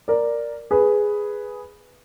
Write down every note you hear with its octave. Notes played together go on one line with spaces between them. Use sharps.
A#4 D5
G#4 B4